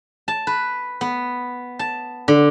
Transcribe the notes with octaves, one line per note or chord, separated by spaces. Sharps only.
A5
B4
B3
A5
D3